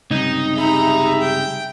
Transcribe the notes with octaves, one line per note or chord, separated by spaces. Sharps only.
C#2 G2 C3 D#4
G4 G#4 E5 A#5 B5
G5